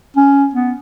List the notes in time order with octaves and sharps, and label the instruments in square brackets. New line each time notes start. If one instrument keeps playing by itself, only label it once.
[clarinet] C#4
B3